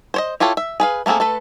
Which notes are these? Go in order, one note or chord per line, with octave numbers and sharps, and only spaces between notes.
C5 C#5 D#5
E4 F4 G4 A4 C#5
E5
G#4 B4 F5
A3 A#3 C4 G#4 A4
A3 A4 B4